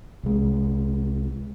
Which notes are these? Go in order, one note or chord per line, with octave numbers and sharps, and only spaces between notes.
C2 G#3